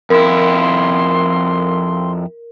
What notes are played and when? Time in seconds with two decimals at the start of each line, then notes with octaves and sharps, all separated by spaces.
0.10 F2 E4 A#4 C6